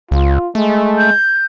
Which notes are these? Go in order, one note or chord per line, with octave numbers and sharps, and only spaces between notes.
C#2 F4
G#3 A3
G6